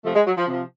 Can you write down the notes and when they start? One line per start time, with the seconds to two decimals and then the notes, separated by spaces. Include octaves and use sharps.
0.04 C3 F3 A3
0.15 G#3
0.26 F#3
0.37 F3
0.47 C3 F3